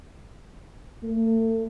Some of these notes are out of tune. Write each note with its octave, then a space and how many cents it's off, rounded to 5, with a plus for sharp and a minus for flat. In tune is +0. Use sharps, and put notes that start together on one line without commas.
A3 +35